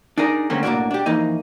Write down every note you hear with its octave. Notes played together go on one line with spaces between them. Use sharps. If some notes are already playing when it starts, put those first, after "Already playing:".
D4 D#4 G#4 A#4 D5
D3 A3 A#3 C4 C#4
B1 A2 A#3 D4 F#4 D5
D4 G4
F2 E3 A#3 D#4 D#5